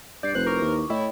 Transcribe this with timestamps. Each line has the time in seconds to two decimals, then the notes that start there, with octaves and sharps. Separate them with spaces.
0.23 G2 D5 G6 C7
0.35 F1 B4 C5 F#6
0.46 E4 A#4 C#6 D6
0.62 D#2
0.90 A2 E4 C#5 D#5 G5